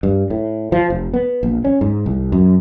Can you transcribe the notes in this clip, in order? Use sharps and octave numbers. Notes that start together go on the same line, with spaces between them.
G2
A2
F3
F1
B3
A#1
C#4
G#2
C2
F#2